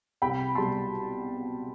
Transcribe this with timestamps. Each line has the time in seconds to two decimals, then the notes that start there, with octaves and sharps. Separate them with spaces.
0.22 C2 G5 B5
0.55 B2 G3 A5 C6